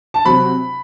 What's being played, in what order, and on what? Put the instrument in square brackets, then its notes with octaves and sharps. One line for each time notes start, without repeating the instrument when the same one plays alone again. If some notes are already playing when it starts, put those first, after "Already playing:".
[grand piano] A5
[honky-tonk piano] C3 F#3 C4 F#4 [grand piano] B5